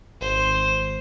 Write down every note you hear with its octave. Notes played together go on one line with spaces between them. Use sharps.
G#1 C5